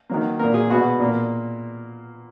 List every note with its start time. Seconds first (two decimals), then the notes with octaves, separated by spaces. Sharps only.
0.09 D#3 F#3 A#3
0.39 A#2 A#3 A#4
0.54 G#4
0.70 B2 G#3 B3 F#4
1.00 A#2 A#3